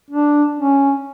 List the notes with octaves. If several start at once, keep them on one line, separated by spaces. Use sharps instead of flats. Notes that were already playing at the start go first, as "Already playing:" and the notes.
D4
C#4